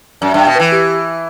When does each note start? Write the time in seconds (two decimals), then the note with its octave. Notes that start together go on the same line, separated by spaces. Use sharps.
0.21 F#2 D5
0.34 G2 G5
0.47 B2
0.55 E3 B4
0.72 G4